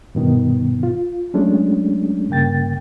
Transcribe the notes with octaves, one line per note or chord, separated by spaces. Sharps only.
G2 B2 D#3 B3
F4
F#3 G#3 A3 C#4 D4
G2 C#3 A#3 G5 A6